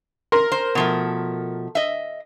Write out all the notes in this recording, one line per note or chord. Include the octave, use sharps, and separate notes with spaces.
A#4 C6
C5
B2 F3 A3
D#5 E5